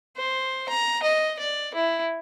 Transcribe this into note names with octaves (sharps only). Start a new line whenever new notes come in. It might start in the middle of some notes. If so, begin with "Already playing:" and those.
C5
A#5
D#5
D5
E4